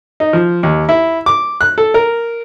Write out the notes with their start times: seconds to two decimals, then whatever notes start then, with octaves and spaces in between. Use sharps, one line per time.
0.20 D#4
0.33 F3
0.63 D#2
0.89 E4
1.26 D6
1.61 F#6
1.78 A4
1.94 A#4